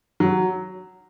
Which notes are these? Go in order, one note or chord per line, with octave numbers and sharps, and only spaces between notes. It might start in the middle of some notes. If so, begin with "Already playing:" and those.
F#3